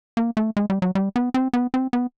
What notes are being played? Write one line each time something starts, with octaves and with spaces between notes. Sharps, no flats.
A#3
A3
G#3
G3
F#3
G3
B3
C4
B3
C4
B3